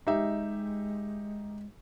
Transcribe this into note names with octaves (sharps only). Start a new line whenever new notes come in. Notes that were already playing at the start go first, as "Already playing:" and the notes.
G#3 D#4 G4 E5